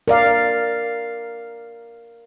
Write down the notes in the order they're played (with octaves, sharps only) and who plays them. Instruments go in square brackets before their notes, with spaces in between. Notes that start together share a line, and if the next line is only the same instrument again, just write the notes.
[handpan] A#4 D5 F5